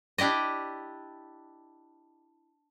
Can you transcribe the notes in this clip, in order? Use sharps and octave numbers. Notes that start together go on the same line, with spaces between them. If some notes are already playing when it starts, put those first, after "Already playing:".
D4 E4 G4 D5 D#5